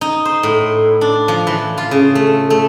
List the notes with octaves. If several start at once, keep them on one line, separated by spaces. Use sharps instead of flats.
D#4
C5
A2
D4
F3
E3
F4
C#3
A3
A3